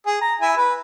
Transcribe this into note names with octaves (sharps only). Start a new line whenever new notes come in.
G#4
A#5
E4 G#5
B4